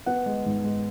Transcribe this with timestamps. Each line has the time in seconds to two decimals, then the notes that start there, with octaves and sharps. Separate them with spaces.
0.06 B3 F#5
0.26 G#3
0.46 G#2
0.64 G#3